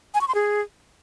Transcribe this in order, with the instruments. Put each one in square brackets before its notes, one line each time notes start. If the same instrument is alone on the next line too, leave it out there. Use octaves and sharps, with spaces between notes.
[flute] G#5
C#6
C6
G#4